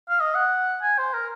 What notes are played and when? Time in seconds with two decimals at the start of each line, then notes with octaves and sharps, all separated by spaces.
0.09 F5
0.20 D#5
0.35 F#5
0.82 G#5
0.98 C5
1.13 A#4